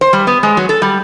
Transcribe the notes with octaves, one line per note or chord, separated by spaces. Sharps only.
C5
G3
B3
G#3
F#3
A4
G3